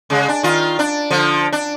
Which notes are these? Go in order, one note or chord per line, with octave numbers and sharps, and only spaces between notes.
C#3 G#3
D4
D#3 F4
D4
D3 F3
D4